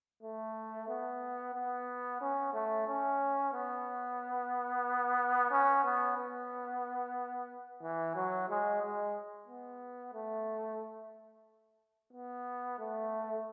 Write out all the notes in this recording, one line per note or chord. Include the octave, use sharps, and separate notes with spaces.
A3
B3
B3
C#4
A3
C#4
B3
C#4
B3
B3
E3
F#3
G#3
G#3
B3
A3
B3
A3